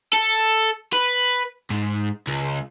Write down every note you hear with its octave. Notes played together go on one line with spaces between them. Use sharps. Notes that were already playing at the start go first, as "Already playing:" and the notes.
A4
B4
G#2
C#2